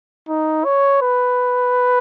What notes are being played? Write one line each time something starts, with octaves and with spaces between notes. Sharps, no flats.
D#4
C#5
B4